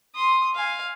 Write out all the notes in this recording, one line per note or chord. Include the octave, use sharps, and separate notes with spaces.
C6 D#6
F5 G#5